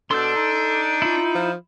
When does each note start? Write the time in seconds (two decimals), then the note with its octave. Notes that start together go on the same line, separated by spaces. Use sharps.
0.11 B2 D4 A4 C6 E6 G6
0.35 D#4
1.02 E4 F4
1.35 F3